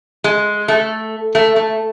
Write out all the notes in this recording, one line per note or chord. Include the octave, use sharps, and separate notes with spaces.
G#3
A3
A3
A3